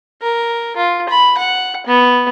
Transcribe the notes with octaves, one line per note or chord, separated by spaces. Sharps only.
A#4
F4
B5
F#5
B3